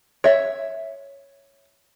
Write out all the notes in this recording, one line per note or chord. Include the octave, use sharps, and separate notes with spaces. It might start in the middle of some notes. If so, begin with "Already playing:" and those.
C#5 E5